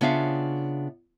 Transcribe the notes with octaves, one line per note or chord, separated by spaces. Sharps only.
C#3 B3 D4 F4 E5 F5